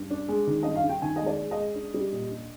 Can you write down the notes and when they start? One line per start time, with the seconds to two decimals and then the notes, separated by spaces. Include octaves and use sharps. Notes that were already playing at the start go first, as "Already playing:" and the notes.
Already playing: G2
0.10 D4
0.28 G#3
0.47 D#3
0.63 G2 D#5
0.76 F5
0.84 G2
0.89 G5
1.02 D#3 G#5
1.16 G#3 D#5
1.26 D5
1.39 G#3
1.51 D#5
1.57 G#3
1.75 D4
1.94 G3
2.12 A#2
2.30 D4